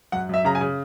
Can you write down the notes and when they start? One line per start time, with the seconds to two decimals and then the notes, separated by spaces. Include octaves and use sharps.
0.12 F#2 F#5
0.29 F#2 E5
0.45 C#3 A#5
0.55 G#5
0.61 C#3